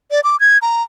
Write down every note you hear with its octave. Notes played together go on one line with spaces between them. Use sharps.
D5
D6
G#6
A#5